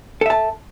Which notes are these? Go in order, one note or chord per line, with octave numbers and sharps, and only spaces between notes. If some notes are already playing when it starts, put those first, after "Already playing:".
A4 E5 A5